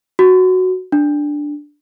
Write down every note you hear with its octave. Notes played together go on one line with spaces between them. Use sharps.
F#4
D4